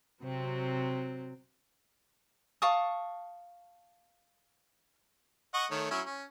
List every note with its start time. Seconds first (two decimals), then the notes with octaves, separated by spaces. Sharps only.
0.23 C3 F#3 C4
2.62 F5 A5 C#6 D#6
5.54 D#5 F#5 C#6
5.71 D#3 A3 C#5
5.91 F#3 C#4 E4
6.06 C#4